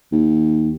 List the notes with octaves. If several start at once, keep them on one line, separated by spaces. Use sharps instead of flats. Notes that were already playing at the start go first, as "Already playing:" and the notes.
D#2